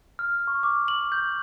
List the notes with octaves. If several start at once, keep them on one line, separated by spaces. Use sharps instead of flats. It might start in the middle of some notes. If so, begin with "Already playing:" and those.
F6
C#6
D6
F#7
G6